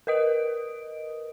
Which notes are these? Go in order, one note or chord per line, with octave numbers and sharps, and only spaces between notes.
A#4 B4 D#5 D#6 D7